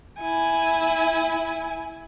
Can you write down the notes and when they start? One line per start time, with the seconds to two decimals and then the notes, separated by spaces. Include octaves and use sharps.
0.21 E4 G#5